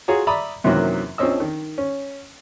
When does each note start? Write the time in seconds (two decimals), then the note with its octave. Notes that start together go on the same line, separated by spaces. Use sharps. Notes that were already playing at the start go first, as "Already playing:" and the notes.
0.08 F4 F#4 G#4 C#5 A#5
0.27 D5 E5 A#5 B5 D#6
0.64 F#2 C3 D#3 E3 F#3 A#3
1.18 A#1 F3 C4 C#4 D#5 E6
1.40 D#3
1.78 C#4